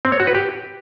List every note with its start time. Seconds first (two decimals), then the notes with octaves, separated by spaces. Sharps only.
0.05 C4
0.12 C#5
0.20 F#4
0.27 B4
0.35 G4